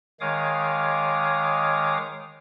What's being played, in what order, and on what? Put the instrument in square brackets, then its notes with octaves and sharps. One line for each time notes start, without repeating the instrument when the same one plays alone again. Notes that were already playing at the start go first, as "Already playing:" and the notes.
[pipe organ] D#3 G#3 C#5 F5 D6 D#6